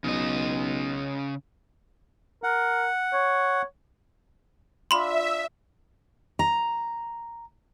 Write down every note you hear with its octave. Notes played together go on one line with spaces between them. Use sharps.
B1 C#3 D#5
A#4 F#5
C#5
D4 F4 D#5 E5 B5 C6
A#5